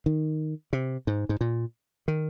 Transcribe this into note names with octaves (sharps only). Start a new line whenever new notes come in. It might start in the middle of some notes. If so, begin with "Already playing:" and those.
D#3
C3
G#2
G#2
A#2
D#3